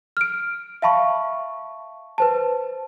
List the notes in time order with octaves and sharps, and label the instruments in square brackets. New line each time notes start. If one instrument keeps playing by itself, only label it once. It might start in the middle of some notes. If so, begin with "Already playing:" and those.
[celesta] F6 D7
E5 F5 A5 B5 C#6
B4 C5 A5